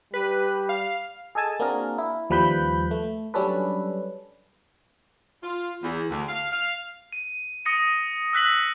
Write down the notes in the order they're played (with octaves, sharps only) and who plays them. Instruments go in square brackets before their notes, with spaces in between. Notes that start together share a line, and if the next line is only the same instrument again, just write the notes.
[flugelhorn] G3 [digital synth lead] B4
[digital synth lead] F5
[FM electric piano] G#4 A4 D#5 G#5 A5
A#3 C4 D4 F#4 G#4 A#4
E4
D#2 F3 G3 B4 B5 G6
A3
F#3 G3 C#4 D4 A4 B4
[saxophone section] F4
E2
D2
F5
F5
[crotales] D#7
D#6 A#6 C#7 D#7
E6 F#6 B6 F#7